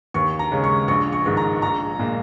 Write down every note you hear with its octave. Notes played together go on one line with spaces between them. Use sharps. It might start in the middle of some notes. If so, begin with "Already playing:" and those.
D#2 C#6
A#5
C#3 G#3 C#4
C#6
A#1 C#6
C#6
G#2 D#3 G#3
A#5
A#1 A#5
A#2 G#3